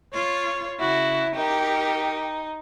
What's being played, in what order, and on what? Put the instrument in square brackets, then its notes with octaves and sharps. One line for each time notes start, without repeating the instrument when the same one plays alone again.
[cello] F4 [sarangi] C#5
[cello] C#3 [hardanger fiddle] E4 [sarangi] F#4
[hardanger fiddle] D#4 [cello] G4 A#4 [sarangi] G5